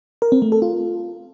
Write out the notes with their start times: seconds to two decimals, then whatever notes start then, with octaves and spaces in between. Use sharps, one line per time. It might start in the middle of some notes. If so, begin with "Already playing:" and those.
0.22 A#4
0.32 C4
0.42 A3
0.52 A4
0.62 F4